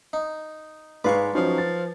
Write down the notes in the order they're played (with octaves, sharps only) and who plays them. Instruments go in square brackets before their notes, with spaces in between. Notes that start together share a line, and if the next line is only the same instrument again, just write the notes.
[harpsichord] D#4
[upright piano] G#2 G#3 [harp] B4 [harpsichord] D5 F5 C#6
[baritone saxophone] F3 [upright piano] F#3 C#4 D#4
[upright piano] A6